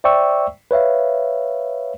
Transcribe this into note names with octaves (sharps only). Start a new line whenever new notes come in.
C5 D5 E5 G5 C#6 E6
B4 C#5 E5 F5